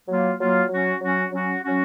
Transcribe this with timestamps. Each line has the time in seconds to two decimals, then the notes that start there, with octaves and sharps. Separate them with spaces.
0.08 F#3 A#3 F4
0.39 F#3 A#3 F4
0.69 F#3 C#4 F#4
1.01 F#3 C#4 F#4
1.32 F#3 C#4 F#4
1.63 F#3 C#4 F#4